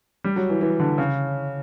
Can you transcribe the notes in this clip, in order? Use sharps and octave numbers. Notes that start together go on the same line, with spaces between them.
G3
F#3
E3
E3
D3
C#3